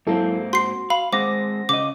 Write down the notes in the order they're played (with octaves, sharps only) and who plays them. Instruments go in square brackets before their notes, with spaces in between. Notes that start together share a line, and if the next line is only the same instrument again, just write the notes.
[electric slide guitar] G#2 A#3 C4 [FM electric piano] F#3 E4 A4
[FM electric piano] F#4 [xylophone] C6 C7
[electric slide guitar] F5 [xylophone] B5
[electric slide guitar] G#3 C4 [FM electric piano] C5 F#5 A#6 [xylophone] D6
[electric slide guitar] C#3 D#5 [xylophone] D6